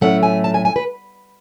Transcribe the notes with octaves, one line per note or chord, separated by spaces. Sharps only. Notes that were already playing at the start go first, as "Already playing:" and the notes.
A2 F#3 A3 C#4 F#5
G#5
A5
G#5
G#5
B4